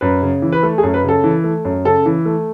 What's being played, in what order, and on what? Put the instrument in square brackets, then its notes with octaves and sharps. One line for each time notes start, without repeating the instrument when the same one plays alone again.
[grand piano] F#2 B4
C#3
E3
B4
A3 A4
G#4
F#2
B4
C#3
A4
E3
A3
F#2
C#3 A4
E3
A3